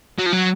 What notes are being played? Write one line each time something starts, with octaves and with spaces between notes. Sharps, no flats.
F#3
F3
F#3